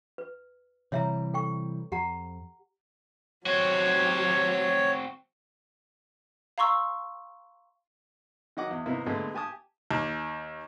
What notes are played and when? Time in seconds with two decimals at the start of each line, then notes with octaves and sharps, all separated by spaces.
0.18 B4
0.92 C3 E3 G3 C#5 E5 A#5
1.34 A4 G5 C#6
1.92 F2 G4 F#5 A#5
3.46 F#3 C4 F#4 G4 C#5
6.58 F5 A#5 C6 C#6 E6
8.57 D#3 F#3 D#5 F#5 D6
8.71 E2
8.86 C3 D#3 A#3 B3 D#4 E4
9.06 A#2 D3 G#3 A3 B3
9.34 G4 G#5 A5 D#6
9.91 D#2